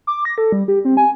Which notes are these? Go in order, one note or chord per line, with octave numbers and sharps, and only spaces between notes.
D6
A#6
A4
G3
G4
C4
G#5